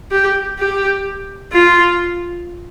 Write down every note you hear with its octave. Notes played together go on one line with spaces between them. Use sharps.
G4
G4
F4